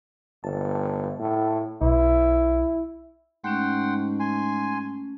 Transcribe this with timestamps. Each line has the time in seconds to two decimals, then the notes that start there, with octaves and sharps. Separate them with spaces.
0.44 G1 A5
1.19 A2
1.81 B1 E4
3.44 G#2 A3 C#4 F#5 G5 C6
4.20 G#5 C6